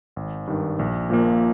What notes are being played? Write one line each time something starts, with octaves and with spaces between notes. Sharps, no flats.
G#1
G2 D#3
A#1
A#2 F3 A#3